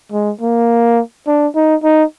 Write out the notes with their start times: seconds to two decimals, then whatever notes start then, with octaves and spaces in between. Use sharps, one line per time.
0.12 G#3
0.41 A#3
1.27 D4
1.55 D#4
1.83 D#4